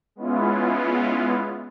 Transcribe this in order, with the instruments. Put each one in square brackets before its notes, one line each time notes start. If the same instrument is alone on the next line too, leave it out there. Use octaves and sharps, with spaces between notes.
[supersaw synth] G#3 B3 C#4 E4 F4